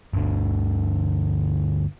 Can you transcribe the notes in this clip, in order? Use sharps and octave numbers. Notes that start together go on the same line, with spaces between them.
G1 D2 D3